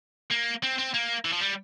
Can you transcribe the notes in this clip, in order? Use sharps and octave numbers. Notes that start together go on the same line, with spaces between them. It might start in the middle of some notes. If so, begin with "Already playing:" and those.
A#3
C4
C4
A#3
E3
F3
G3